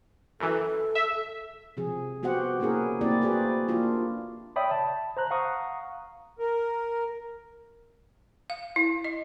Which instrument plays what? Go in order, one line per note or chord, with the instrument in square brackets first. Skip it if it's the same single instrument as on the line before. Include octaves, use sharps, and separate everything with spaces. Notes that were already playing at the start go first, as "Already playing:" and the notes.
[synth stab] F#2 E3 [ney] A4
[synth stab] E5
[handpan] C3 F3 G#4
B3 F#4 G4 C5 F#5
A#3 C#4 E4 G#4 A#4
A3 A#3 C4 E4 G4 D5
F#4 G#4 B4 C5 D5
A#3 D4 E4 F4 G4
[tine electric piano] C#5 D5 E5 G5 B5 D#6
A5
C5 A#5 F#6
F5 F#5 A#5 C#6 D#6
[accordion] A#4
[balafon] F5
E4
D#5